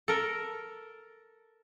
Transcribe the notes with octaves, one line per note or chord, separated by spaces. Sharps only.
A4 A#4